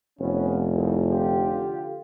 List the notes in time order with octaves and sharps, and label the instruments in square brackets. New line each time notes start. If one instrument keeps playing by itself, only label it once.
[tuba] F1 [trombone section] B3 C#4
[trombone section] C2
D3 F4 G4